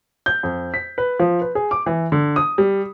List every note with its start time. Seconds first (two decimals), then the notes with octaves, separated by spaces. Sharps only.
0.26 G6
0.43 F2
0.74 B6
0.98 B4
1.19 F3
1.41 B4
1.55 G#4
1.71 D6
1.86 E3
2.12 D3
2.36 D#6
2.58 G3